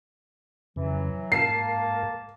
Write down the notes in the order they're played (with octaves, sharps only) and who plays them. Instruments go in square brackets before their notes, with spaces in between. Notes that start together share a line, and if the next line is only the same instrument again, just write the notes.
[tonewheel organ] F2 C#3 [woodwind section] E3 F#3
[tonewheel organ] G#2 A#4 [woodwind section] A#3 A5 [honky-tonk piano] C7